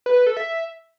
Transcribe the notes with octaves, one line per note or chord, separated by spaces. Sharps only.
B4
B4
A4
E5